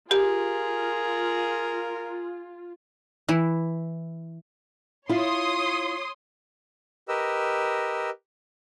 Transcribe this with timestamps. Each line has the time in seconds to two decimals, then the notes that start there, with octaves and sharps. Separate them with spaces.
0.11 F4 G4 G#4 A#4
3.28 E3 E4
5.09 E4 F4 C#5 C6 D#6
7.08 G4 A#4 B4 D#5 E6